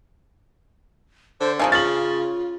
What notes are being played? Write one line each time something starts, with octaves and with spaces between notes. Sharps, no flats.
D3 C5
C#3 F3 D#4 F5 G#5 A5
C#3 F4 F5 A6 F#7